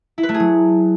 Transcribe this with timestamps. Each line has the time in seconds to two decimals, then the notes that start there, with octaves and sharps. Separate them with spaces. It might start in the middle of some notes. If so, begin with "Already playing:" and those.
0.18 E4
0.23 B4
0.29 A3
0.34 G#4
0.40 F#3